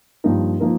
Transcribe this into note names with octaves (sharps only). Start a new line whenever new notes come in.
G2 F3 A#3 D#4 A#4
F3 A#3 D#4 A#4